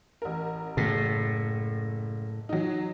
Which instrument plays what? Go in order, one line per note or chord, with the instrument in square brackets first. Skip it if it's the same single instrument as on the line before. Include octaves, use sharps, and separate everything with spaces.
[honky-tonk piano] A1 A#4
[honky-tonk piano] F#1 [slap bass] A2
[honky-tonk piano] F#3 D#4